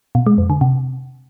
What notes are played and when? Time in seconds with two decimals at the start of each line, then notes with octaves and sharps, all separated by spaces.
0.15 B2
0.27 G#3
0.38 F2
0.50 D3
0.61 C3